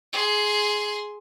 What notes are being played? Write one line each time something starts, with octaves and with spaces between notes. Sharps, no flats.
G#4 C6